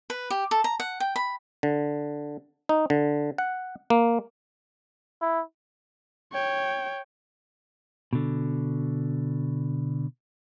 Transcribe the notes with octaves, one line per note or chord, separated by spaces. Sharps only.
B4
G4
A4
A#5
F#5
G5
B5
D3
D#4
D3
F#5
A#3
E4
C#5 G5
B2 D3